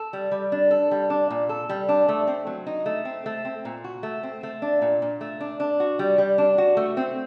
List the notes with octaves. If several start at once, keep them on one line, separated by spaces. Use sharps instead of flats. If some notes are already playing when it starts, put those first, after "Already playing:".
Already playing: A4
G3
G3
D4
A4
G3
D4
A#2
A4
G3
D4
A3
C4
F#3
D#4
A3
C4
A3
C4
A#2
F#4
A3
C4
A3
D4
A#2
A#2
A3
D4
D4
F#4
G3
G3
D4
F#4
A3
C4